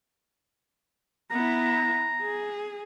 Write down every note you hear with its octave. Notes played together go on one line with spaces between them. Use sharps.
B3 E4 A#5
G#4